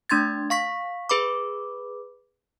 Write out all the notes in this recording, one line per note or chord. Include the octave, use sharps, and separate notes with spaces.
A3 D4 C6 G#6 A6
F5 C#6 B6
G#4 B4 B5 D6